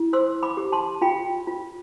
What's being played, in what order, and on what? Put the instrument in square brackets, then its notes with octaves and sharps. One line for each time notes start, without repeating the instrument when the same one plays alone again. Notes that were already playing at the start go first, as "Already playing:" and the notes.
Already playing: [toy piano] E4
C5 C6 E6
B5 D6
G4
A5 C6
F4 G5 B5
F4